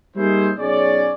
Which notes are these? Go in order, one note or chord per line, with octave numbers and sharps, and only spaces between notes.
G3 A#3 D#4 E4 G#4 C5
B1 C#4 G#4 C#5 D5